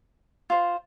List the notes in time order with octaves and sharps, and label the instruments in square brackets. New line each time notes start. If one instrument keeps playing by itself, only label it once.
[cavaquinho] F4 C5